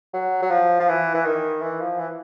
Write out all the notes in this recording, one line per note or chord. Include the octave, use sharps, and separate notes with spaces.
F#3
F#3
F3
F3
E3
E3
D#3
E3
F3
E3